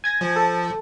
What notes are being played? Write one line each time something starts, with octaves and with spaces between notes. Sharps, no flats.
G#5 G#6 A#6
F3
A4